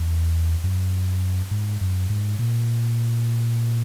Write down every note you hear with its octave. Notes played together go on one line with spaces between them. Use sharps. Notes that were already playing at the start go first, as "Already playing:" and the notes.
Already playing: E2
F#2
G#2
F#2
G#2
A#2